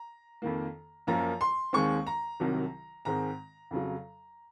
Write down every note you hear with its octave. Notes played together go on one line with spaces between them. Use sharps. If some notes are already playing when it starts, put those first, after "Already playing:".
Already playing: A#5
F2 D#3 A#3
F#2 F3 A#3 A#5
C6
D#2 D#3 G#3 C4 C#6
A#5
C2 C3 D#3 F#3
G#2 D#3 G#3 C4 A#5
F2 C#3 F#3